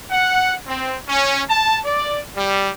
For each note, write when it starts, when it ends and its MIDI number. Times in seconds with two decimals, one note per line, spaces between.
0.11 0.54 78
0.68 0.95 60
1.09 1.42 61
1.49 1.78 81
1.85 2.20 74
2.36 2.68 55